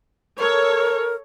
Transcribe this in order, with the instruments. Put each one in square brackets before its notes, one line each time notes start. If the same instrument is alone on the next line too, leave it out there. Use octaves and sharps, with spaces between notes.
[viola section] A4 C#5 [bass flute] A#4